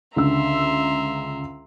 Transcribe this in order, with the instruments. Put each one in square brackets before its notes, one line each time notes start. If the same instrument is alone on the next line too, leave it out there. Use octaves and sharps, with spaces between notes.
[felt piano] C#2 D3 E6 [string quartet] E5 A#5 C6